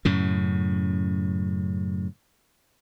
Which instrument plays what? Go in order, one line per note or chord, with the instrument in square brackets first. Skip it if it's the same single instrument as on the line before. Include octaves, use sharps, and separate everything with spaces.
[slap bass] F#2 A2 C#3